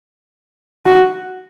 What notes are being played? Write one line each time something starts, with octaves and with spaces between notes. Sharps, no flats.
F#4